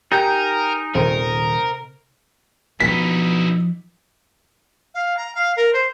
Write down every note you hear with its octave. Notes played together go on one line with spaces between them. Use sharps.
D#4 G4 A#4 G#5 G6
D#1 C3 D#3 A#4
B2 F3 D#4 E4 B6
F5
A#5
F5
A#4
C5